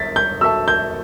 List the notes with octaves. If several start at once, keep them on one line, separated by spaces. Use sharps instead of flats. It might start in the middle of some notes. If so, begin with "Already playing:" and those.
Already playing: E5 A6 B6
G6
F#4 A4 E5 A5 E6
G6